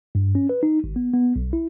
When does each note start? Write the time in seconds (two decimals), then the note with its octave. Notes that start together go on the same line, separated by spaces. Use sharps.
0.15 G2
0.35 C#4
0.49 B4
0.63 D#4
0.84 G#1
0.96 B3
1.13 B3
1.36 B1
1.53 E4